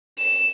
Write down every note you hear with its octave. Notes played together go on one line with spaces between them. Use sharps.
E7